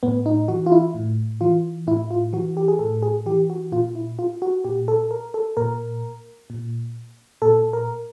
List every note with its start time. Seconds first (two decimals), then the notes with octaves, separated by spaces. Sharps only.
0.03 A2 B3
0.26 D#4
0.48 E3 F#4
0.66 F4
0.72 E4
0.94 A2
1.41 E3 F4
1.87 A2 E4
2.11 F4
2.33 E3 F#4
2.57 G4
2.68 G#4
2.79 A2 A4
3.02 G#4
3.26 E3 G4
3.50 F#4
3.72 A#2 F4
3.95 E4
4.19 F4
4.42 F#4
4.64 A#2 G4
4.88 A4
5.11 A#4
5.34 A4
5.57 A#2 A#4
6.50 A#2
7.42 A#2 A4
7.73 A#4